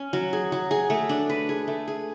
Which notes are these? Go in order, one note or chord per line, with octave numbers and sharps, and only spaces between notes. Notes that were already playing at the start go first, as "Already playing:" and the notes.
Already playing: C#4
F#3
G#4
F#3
G#4
A3
D4
B4
G#4
A3
G#4